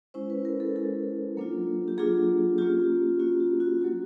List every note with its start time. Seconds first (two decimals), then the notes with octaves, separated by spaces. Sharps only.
0.14 G#3 C#4 E4 C5
0.30 B4
0.45 A#4
0.60 A4
0.76 G#3 C#4 E4 A4
1.37 F#3 A#3 D4 F4
1.88 G4
1.97 F#3 A#3 D4 F4 G#4
2.58 A#3 C#4 F4 G4
3.20 A#3 C#4 F4 F#4
3.40 G4
3.60 F#4
3.81 F#3 A#3 D4 F#4 G4